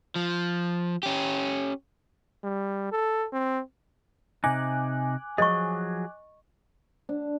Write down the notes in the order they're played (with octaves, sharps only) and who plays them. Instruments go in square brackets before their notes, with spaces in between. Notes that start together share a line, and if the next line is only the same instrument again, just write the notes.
[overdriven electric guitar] F3
C#4 G4
[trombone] G3
A4
C4
[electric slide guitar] C3 D#4 [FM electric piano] G#5 D6 F#6
[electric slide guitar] F3 F#3 G#4 [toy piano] D#5 C#6
[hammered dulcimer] D4